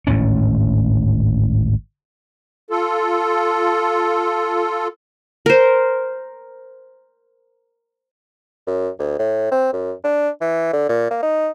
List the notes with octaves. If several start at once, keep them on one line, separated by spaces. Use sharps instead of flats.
G#1 D2 A2 C#4
F4 A4
A#4 C5
F#2
D2
A2
C4
F#2
D4
E3
D3
A#2
A#3
D#4